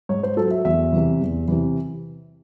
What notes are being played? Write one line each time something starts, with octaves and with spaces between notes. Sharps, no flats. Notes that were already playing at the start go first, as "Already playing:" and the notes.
G#2 C#5
C5
F#3 A4
E5
E2 E5
C3 E3
E2
C3 E3